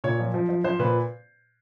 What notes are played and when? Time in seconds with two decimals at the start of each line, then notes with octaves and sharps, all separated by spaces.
0.04 A#2 C#5
0.19 F3
0.34 F3
0.49 F3
0.64 F3 C5
0.79 A#2 B4